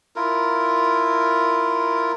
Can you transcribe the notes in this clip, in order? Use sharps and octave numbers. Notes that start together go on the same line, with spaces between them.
E4 F4 A#4